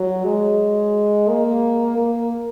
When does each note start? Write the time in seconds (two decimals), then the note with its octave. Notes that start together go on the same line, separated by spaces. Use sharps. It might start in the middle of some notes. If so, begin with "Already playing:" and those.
Already playing: F#3
0.24 G#3
1.29 A#3
1.97 A#3